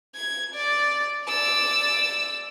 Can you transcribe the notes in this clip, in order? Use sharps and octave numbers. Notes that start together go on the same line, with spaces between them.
G#6
D5
D5 E6